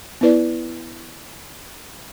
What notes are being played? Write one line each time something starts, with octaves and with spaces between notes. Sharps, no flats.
B3 E4 B4 D5